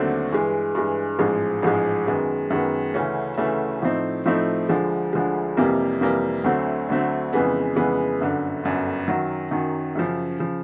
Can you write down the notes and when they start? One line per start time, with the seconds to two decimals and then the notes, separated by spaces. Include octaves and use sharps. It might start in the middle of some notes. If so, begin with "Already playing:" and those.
Already playing: D#2 D3 F#3 A3 C4
0.32 G2 E3 G#3
0.75 G2 E3 G#3
1.19 A1 G#2 F3 G#3
1.62 A1 G#2 F3 G#3
2.07 F#2 D#3 G#3 B3
2.50 F#2 D#3 G#3 B3
2.94 D2 C#3 E3 A3 C#4
3.38 D2 C#3 E3 A3 C#4
3.82 A2 F3 A3 C4 D#4
4.26 A2 F3 A3 C4 D#4
4.69 D2 D3 F3 G#3
5.13 D2 D3 F3 G#3
5.57 F2 C3 E3 G3 A#3
6.01 F2 C3 E3 G3 A#3
6.44 D2 D3 F#3 A3 C4
6.89 D2 D3 F#3 A3 C4
7.33 F2 C#3 E3 G#3 B3
7.76 F2 C#3 E3 G#3 B3
8.21 G1 F#2 D3
8.64 G1 F#2 D3
9.08 F#2 D#3 F#3
9.51 F#2 D#3 F#3
9.95 F#2 C#3 F3
10.39 C#3 F3